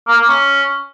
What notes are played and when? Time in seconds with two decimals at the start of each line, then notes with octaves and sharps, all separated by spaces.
0.08 A#3
0.18 A#3
0.28 C#4